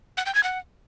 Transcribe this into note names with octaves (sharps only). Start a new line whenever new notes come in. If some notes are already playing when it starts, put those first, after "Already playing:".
F#5
G5
G#6
F#5